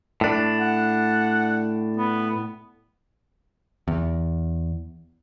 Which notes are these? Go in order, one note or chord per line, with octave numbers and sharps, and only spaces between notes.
A2 D4
F#5
B3
E2